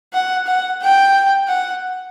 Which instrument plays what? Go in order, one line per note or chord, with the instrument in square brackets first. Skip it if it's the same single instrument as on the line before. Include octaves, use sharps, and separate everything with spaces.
[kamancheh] F#5
F#5
G5
F#5